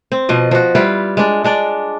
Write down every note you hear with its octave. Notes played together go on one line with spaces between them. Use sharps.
C4
B2 F3 D#5
F3 F#4
G3 E4 F4 B4
G#3 D4
G#3 D4 D5